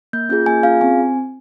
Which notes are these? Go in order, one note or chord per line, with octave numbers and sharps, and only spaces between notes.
A#3 G6
C#4 F4 G#4 G6
A#3 G#5
C#4 F4 G#4 F5
C4 G#5